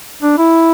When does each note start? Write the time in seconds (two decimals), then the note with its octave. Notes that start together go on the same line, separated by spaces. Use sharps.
0.22 D4
0.38 E4